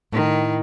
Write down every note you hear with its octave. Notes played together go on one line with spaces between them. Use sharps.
A2 D#3